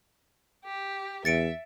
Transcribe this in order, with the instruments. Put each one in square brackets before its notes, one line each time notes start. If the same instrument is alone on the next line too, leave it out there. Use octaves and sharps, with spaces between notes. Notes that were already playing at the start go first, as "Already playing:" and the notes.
[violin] G4
[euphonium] E2 [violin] E5 [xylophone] A6 C#7 D7